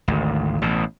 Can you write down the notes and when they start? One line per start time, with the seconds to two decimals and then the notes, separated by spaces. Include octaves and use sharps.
0.08 G#1 D2
0.62 A1 B2